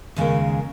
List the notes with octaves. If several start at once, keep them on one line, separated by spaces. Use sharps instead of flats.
D#2 C#3 G#3 C#4 A#4